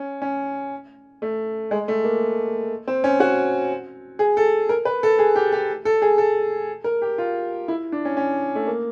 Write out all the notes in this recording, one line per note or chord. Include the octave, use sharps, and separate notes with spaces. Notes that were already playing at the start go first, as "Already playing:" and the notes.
Already playing: C#4
C#4
A3
G#3
A3
A#3
C4
C#4
F#4
G#4
A4
A#4
B4
A4
G#4
G4
G4
A4
G#4
A4
A#4
G4
F4
E4
D4
C#4
C#4
A3
A#3